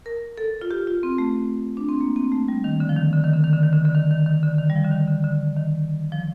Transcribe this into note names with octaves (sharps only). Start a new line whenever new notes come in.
A#4
A4
F4
G4
F4
C4
A3
D4
C4
A#3
C4
A3
G3
D#3
D3
F3
D#3
D3
D#3
D3
D#3
D3
D#3
D3
D3
D#3
D#3
D#3
D3
D#3
G3
F3
D3
D#3
D3
D3
D#3
F3